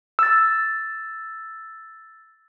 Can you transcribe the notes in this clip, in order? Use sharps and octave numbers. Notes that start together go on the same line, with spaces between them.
E6 A6